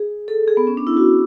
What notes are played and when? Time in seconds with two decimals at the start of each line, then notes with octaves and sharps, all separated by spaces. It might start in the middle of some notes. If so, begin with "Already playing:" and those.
Already playing: G#4
0.28 A4
0.48 G#4
0.57 B3
0.67 C#4
0.77 D4
0.87 E4
0.97 F#4